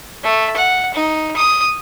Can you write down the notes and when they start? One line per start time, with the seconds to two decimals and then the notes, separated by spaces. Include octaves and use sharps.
0.24 A3
0.56 F#5
0.95 D#4
1.37 D#6